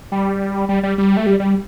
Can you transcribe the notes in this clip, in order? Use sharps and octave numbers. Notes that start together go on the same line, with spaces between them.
G3
G3
G3
G3
A3
G3
G3